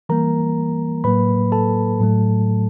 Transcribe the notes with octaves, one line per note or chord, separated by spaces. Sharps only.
E3 G3 A#3 A#4 A#5
A2 F#3 A#3 B4 B5
A4 A5
A2 F#3 A3